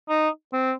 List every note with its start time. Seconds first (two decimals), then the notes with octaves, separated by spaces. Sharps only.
0.09 D#4
0.53 C4